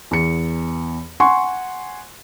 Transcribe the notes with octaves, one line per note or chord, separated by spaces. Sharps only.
E2 C#7
F#5 G#5 C6 C#6